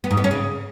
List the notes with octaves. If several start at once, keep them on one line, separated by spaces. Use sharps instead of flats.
B3
G#2
B3
C#4
C#3